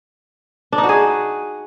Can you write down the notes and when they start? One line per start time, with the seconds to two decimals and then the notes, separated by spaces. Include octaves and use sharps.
0.72 D4
0.78 D#4
0.83 F#4
0.89 G#4